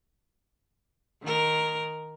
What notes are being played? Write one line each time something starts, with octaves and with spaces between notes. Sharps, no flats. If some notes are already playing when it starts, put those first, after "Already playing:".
D#3 A#4